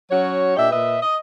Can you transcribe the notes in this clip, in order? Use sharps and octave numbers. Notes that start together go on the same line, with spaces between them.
F#3 C#4 F#4 C#5
A#2 D4 G4 D#5 E5
A#2 B4 D#5 E5
D#5